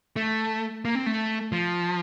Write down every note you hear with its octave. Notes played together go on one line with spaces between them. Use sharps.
A3
A#3
C4
A3
F3